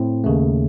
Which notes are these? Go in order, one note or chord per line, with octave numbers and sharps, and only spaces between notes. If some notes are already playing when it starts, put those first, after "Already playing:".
Already playing: A2 C4
D#2 C#3 A3